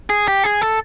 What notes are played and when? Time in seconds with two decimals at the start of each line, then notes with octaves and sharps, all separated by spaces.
0.10 G#4
0.28 G4
0.44 G#4
0.61 A4